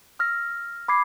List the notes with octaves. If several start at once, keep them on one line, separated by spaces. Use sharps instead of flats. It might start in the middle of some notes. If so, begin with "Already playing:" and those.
E6 F6 A#6
B5 D6 G#6 C7